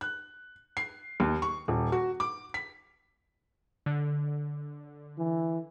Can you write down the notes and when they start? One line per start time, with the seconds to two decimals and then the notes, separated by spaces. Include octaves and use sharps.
0.01 F#6
0.77 C7
1.20 D#2
1.42 C#6
1.68 D#1
1.92 F#4
2.20 D6
2.54 B6
3.86 D3
5.18 E3